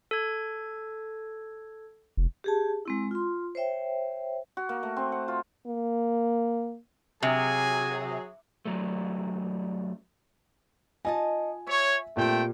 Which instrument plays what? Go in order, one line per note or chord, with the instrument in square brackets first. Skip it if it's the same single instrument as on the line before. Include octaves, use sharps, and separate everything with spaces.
[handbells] A4 G#6
[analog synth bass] F1
[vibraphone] G4 G#4 A5
G#3 C4 E4
F4 C6
C5 C#5 E5 G5
[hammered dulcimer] F#4
A#3
A3
C4
F#5
F4
[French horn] A#3
[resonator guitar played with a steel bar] C3 [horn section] F#3 G#4 [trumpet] G#5
[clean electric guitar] F#2 D#3 F#3 G3 A3
[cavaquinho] D#4 D#5 A5 [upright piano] F4 G#5
[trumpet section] C#5 [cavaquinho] E5
[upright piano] A#2 G4 [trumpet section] A3 C4 G5